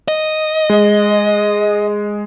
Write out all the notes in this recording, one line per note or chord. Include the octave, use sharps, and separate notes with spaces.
D#5
G#3